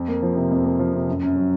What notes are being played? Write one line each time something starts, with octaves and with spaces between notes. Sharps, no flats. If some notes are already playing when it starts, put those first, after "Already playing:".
Already playing: F2
A#3
F3
C3
F2
A#3
F3
C3
F#2
F#2
F#3